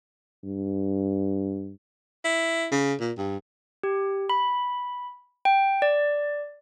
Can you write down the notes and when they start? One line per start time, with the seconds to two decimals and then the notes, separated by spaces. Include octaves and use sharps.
0.44 G2
2.25 E4
2.72 C#3
3.00 A#2
3.17 G2
3.83 G4
4.30 B5
5.45 G5
5.82 D5